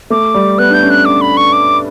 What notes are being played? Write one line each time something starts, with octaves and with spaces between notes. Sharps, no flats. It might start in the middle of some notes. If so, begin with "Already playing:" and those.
A3 D6
G3
B3 F#6
D4 G6
C#4
F#6
D6
B5
C#6
D6